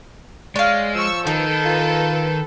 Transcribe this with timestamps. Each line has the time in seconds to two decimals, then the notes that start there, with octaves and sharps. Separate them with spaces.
0.56 G#3 C#5 D5 F5
0.95 F3 C#6 E6
1.27 D#3 D#4 A4 B4
1.66 F4